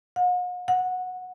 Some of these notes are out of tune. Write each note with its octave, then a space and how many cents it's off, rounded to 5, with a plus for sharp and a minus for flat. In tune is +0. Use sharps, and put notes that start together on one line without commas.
F#5 -45
F#5 -15